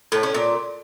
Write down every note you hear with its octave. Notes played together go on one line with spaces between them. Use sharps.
A2
C#4
A#2